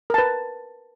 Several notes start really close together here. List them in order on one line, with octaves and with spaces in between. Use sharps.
A#4 A5 B4